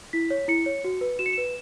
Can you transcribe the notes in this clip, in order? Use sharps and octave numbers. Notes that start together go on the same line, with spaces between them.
E4 B6
C#5
E4 C#7
C#5
F#4
B4
F#4 E7
C#7
B4 E7